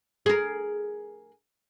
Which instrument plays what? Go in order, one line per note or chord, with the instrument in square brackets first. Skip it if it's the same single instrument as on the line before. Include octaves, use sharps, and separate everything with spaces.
[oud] G#4 A#4